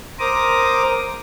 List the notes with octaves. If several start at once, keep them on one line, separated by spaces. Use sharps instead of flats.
A#4 C5 A#5 D6 D#6